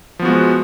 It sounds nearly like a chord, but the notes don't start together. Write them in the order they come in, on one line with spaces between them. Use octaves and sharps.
F3 B3 F#4 G#3